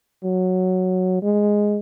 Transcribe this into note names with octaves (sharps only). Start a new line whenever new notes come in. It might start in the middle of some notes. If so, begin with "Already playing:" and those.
F#3
G#3